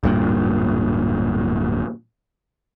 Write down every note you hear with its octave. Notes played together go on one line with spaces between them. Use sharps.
D1 G2 A#2